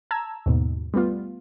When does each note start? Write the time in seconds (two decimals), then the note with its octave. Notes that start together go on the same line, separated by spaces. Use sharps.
0.11 A5 A#5 E6 G#6
0.46 D#2 G#2 B2
0.94 G3 A3 B3 F4